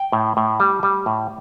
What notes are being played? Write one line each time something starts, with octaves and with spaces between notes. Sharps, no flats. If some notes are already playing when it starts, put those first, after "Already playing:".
Already playing: G5
A2
A2
G3
G3
A2